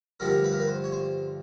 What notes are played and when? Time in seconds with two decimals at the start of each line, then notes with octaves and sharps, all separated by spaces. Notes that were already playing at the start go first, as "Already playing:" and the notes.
0.20 G2 D3 F3 A3 A#4
0.44 B4
0.52 A#4
0.60 B4
0.68 C5
0.84 C#5
0.92 C5